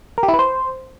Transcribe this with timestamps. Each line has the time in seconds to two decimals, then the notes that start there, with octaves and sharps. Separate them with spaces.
0.18 A#4
0.23 G4
0.28 E4
0.34 B4
0.39 C5